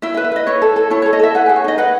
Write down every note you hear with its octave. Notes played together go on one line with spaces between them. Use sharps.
E4 E5
E5
B4
E5
B4 D#5
E4 C#5
A4
A4
E4 C#5
A4 C#5
D#5
A4 E5
B4 F#5
G#4 G#5
C#5
D#4 D#5
B4 F#5